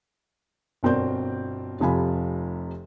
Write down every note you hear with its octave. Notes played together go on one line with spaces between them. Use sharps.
G1 B2 C4 A#4 D5 G6
F1 C3 F3 G#5 B5